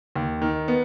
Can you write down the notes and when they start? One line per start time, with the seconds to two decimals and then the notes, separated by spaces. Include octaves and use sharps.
0.16 D#2
0.42 D#3
0.68 B3